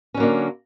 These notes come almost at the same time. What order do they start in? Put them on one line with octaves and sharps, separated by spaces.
C#4 F#3 A#3 D3